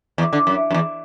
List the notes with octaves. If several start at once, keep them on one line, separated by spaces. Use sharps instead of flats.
E2
D3
F#2
F#2
E2